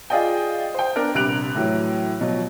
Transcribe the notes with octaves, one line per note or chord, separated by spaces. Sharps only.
F4 G#4 D5 D#5 G5
C5 G5
B3 D4 A#4
A#1 C3 G3 F#6 D7 F7
A2 E3 F#3
B2 F3 F#3